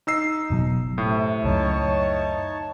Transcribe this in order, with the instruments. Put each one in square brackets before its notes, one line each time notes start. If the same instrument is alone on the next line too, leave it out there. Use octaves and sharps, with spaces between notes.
[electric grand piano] D#4 E6 C7
[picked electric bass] F#1 B2 F#3
[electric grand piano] A2 [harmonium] C3
[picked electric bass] C#2 F#2 [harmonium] D#4 C#5 A5